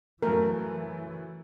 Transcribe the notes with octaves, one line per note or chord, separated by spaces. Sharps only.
F#2 E3 A3 A#4